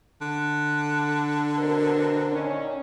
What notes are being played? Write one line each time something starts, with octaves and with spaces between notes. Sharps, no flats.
D3
B2 C4 A#4
A#2 D#3 C#4